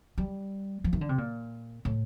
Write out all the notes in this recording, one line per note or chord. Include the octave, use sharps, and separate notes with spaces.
G3
F3
D#3
D3
C3
A#2
A2